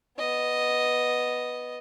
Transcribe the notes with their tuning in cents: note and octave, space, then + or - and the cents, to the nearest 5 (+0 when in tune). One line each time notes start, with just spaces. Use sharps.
B3 +0 D#5 -5